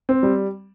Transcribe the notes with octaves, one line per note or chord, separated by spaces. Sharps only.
C4
G3